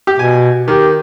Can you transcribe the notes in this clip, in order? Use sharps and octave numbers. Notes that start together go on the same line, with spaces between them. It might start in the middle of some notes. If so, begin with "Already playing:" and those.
G4
B2 G#5
D#3 G4